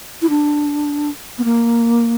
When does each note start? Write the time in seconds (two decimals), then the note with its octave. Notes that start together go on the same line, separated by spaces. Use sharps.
0.22 E4
0.30 D4
1.39 B3
1.44 A#3